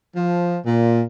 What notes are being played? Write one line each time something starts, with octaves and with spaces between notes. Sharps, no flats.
F3
A#2